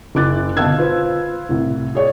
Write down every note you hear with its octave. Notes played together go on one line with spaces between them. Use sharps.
F#1 E4 D6 F#6 A6
G1 B2 F5 A5 E6 G#6
F4 B4 C5
C2 A2
G#4 C#5 D5